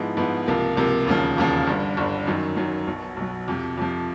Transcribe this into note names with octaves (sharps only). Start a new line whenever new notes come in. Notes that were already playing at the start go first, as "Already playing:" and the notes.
Already playing: G#2 F3 G#3 B3 E4
G#2 F3 G#3 B3 E4
C#2 C3 F3 A#3
C#2 C3 F3 A#3
E1 D#2 C#3 F3
E1 D#2 C#3 F3
G1 G2 D3
G1 G2 D3
F#2 D#3 F#3
F#2 D#3 F#3
B1 B2 F#3
B1 B2 F#3
F2 C3 F3
F2 C3 F3